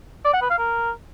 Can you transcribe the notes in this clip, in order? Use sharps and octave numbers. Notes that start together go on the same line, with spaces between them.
D5
F#5
B4
F5
A#4